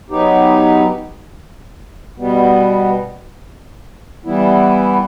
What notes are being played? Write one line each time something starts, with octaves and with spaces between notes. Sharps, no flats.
F#3 B3 D#4 G4
B2 G3 B3
E3 G3 B3 E4